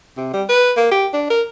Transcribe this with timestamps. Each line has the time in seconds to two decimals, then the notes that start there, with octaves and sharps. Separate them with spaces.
0.17 C3
0.33 G3
0.49 B4
0.77 A#3
0.91 G4
1.13 D4
1.30 A#4